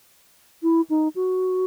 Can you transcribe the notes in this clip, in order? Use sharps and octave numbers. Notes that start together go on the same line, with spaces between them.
E4
D#4
F#4